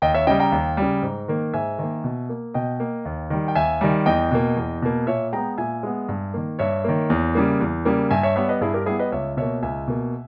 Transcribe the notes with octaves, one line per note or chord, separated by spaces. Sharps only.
D#2 D#5 G5
C#5 E5
C#3 G3 D#5 G5
G5 A#5
D#2
C#3 G3
G#2
D#3 A#3
G#2 E5 G#5
D#3 A#3
B2
A#3
B2 D#5 G5
A#3
D#2
D#3 G3
G5
D#2 E5 G#5
D#3 G3
E2 D#5 G5
B2 A#3
E2
B2 A#3
A#2 C#5 E5
G#3 B3 G5 A#5
A#2 E5 G#5
G#3 B3
G2
D#3 A#3
G2 C#5 E5
D#3 A#3
E2
C#3 G3 A#3
E2
C#3 G3 A#3
G2 E5 G#5
C#5 E5
G3 B3 C#5 E5
B4 D#5
G2 E4 G#4
G4 A#4
G3 B3 E4 G#4
B4 D#5
C#2 C#5 E5
B2 A#3 C#5 E5
C#2 E5 G#5
B2 A#3